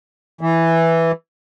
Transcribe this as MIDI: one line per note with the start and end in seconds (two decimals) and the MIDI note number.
0.41 1.12 52